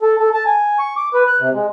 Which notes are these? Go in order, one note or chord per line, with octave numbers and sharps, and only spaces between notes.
A4
A4
A5
G#5
C#6
D6
B4
F#6
C3
G#3